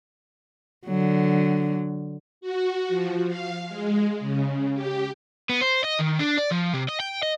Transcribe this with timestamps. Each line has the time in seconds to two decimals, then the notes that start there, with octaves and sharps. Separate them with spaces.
0.86 D3 F#3
2.41 F#4
2.89 F3
3.27 F5
3.68 G#3
4.20 C#3
4.74 G4
5.49 B3
5.62 C5
5.84 D#5
6.00 D#3
6.20 D4
6.38 D5
6.52 F3
6.74 C3
6.89 D#5
7.00 G5
7.23 D#5